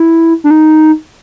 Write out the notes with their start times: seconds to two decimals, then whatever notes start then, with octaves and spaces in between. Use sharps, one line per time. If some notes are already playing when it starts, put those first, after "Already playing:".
Already playing: E4
0.44 D4
0.51 D#4